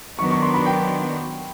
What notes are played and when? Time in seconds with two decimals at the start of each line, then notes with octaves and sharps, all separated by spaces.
0.18 D#3 F#3 B3 D4 C#6
0.31 C#6
0.42 C6
0.54 B5
0.66 G5